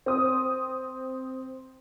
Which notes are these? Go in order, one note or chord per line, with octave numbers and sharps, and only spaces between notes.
C4 D#6